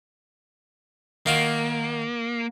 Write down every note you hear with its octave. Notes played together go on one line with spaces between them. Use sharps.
D#3 A#3 F4 F#4